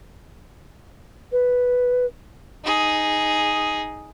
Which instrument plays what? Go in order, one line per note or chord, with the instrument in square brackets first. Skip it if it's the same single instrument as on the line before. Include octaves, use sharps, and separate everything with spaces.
[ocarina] B4
[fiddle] D#4 G#4